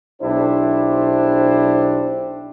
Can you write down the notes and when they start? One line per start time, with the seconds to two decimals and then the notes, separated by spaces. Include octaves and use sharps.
0.22 B1 D4 E4 G4 C5